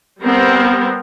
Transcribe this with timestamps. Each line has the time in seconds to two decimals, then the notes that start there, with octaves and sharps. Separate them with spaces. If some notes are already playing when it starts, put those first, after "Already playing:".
0.22 G3 B3 C4 A#4